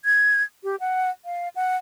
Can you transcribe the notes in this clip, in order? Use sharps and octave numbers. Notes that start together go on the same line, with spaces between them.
G#6
G4
F#5
F5
F#5